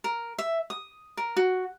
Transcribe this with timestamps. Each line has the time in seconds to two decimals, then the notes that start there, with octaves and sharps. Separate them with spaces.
0.04 A#4
0.38 E5
0.70 D#6
1.17 A#4
1.36 F#4